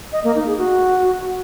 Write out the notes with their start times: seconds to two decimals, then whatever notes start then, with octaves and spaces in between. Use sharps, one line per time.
0.12 D#5
0.24 A#3
0.35 D#4
0.46 G#4
0.58 F#4